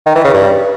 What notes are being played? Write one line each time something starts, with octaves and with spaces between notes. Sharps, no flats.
D#3
E3
C#3
G2